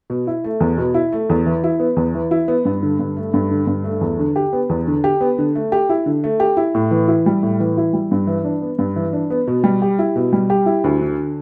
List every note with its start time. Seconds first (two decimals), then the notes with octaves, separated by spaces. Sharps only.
0.10 B2
0.27 E4
0.44 A3
0.60 E2
0.78 B2
0.94 E4
1.12 A3
1.30 E2
1.46 E3
1.64 E4
1.80 B3
1.97 E2
2.15 E3
2.31 E4
2.48 B3
2.65 G2
2.83 D3
2.99 G2
3.17 A3
3.34 G2
3.51 D3
3.67 G2
3.84 A3
4.01 E2
4.19 D3
4.36 G4
4.53 B3
4.70 E2
4.87 D3
5.04 G4
5.21 B3
5.38 D3
5.55 A3
5.72 G4
5.89 E4
6.06 D3
6.24 A3
6.40 G4
6.57 E4
6.75 A2
6.91 E3
7.08 E4
7.26 G3
7.43 A2
7.60 E3
7.77 E4
7.93 G3
8.11 G2
8.27 E3
8.45 D4
8.62 B3
8.79 G2
8.96 E3
9.13 D4
9.30 B3
9.47 B2
9.64 G3
9.82 G4
9.99 E4
10.16 B2
10.33 G3
10.50 G4
10.66 E4
10.84 D2
11.01 D3